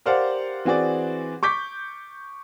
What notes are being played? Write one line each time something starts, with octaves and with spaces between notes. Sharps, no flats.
G4 A#4 C5 D5 F5 F#5
E3 C4 F#4 G#4 D5
C#6 D6 G6 B6